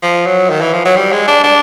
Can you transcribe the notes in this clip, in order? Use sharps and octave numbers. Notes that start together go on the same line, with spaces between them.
F3
F#3
D#3
E3
F3
F#3
G3
G#3
D4
D4